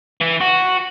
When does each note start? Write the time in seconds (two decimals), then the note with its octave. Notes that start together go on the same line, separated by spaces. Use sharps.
0.21 E3
0.41 F#4